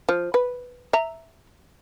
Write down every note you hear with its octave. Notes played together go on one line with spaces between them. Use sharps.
F3
B4
E5 A#5